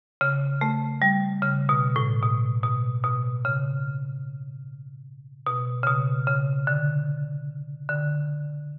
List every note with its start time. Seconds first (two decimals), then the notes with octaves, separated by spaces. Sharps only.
0.21 C#3
0.61 A3
1.02 G3
1.42 C#3
1.69 B2
1.96 A2
2.23 B2
2.64 B2
3.04 B2
3.45 C#3
5.47 B2
5.83 C#3
5.87 B2
6.27 C#3
6.67 D3
7.89 D3